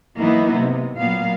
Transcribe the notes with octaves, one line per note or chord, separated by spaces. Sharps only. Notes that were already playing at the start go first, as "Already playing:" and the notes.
E3 F#3 A#3 B3 D#4 E4
C3
A#2 F#3 A#3 B3 F5